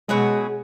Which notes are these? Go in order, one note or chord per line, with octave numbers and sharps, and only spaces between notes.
B2 F#3 G#3 C#4 G#4